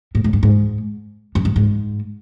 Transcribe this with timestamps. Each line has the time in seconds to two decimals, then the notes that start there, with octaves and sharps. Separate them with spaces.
0.15 A2
0.24 G#2
0.33 G2
0.43 G#2
1.35 F#2
1.45 G2
1.56 G#2